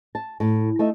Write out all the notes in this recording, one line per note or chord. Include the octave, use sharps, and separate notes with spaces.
A5
A2
A3 D#4 E5